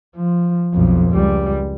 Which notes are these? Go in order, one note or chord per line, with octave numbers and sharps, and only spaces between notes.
F3
B1 F2
C#2 G3